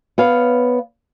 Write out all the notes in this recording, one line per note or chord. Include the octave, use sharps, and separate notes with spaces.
B3 C#5 F5